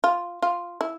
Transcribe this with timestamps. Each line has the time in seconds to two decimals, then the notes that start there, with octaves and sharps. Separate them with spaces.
0.04 F4
0.42 F4
0.81 E4